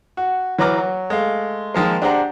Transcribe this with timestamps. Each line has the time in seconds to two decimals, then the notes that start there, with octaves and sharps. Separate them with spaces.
0.17 F#4
0.58 E3 F#3 B4 A#5 D6 F6
0.78 F#3
1.10 G#3 A3 F5
1.74 D#3 F3 G#3 A#3
2.02 D4 G4 G#4 C5 F#5 A#5